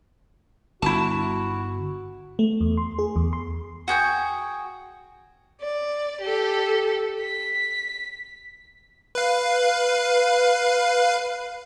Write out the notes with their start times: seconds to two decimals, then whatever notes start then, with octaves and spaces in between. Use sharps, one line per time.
0.82 G1 E4 F#4 A5
2.39 A3
2.61 E2
2.77 C6
2.99 G#4
3.16 E2
3.33 C6
3.88 F#4 G#4 G5 C#6
5.61 D5
6.21 G4 A4
7.21 B6
9.15 B4 F5